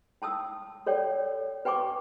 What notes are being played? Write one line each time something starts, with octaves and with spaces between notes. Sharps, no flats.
G5 A5 D#6 E6
A4 C#5 D5 G5
B4 G5 G#5 C#6 D6